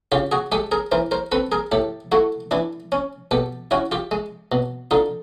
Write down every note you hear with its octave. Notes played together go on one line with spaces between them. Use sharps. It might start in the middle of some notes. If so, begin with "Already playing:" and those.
C#3 F4 G4
F#4 G#4
G#3 G4 A4
G#4 A#4
E3 A#4 C5
A#4 C5
C4 A4 B4
G#4 A#4
A2 G4 A4
A3 E4 F#4
E3 D4 E4
C#4
B2 G4 A4
C#4 E4 F#4
F4 G4
G#3
B2
D3 D#4 F4